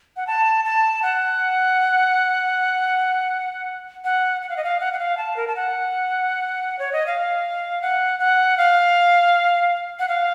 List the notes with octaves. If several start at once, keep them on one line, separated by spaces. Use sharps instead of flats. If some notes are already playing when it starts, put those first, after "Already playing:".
F#5
A5
A5
F#5
F#5
F#5
F5
D#5
F5
F#5
F#5
F5
A5
A#4
A5
F#5
C#5
D#5
F5
F#5
F#5
F5
F#5
F5